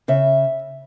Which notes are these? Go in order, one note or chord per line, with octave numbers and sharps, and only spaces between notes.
C#3 E5